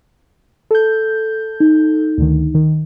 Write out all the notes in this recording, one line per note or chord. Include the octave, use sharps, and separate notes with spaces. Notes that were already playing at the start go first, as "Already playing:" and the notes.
A4 G6
D#4
D2 D3 D#3
D#3